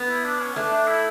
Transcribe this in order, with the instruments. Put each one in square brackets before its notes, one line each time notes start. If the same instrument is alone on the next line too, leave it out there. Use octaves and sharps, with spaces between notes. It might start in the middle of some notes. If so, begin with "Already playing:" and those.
Already playing: [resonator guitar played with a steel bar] B3
[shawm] E4
D4
C#4
[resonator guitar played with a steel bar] A3 [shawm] D4
[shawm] D4
E4